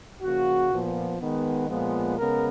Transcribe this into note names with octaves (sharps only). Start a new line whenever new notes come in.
C#3 F3 A#3 F#4
A#2 F3 B3
D#3 G#3 B3
A#2 F3 G#3 B3
C#3 G#3 B3 A#4